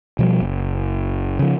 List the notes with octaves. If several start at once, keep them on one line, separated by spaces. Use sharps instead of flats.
B2 F3 G3
F#1
C#3 F3